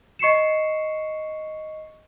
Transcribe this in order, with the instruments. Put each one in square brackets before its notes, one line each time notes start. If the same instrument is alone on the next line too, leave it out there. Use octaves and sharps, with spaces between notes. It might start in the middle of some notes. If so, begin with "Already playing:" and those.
[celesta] D#5 C#6 C7 C#7 E7